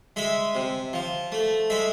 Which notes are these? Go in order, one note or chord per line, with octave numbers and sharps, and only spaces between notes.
G#3 E5
C3
F3
A3
G#3 E5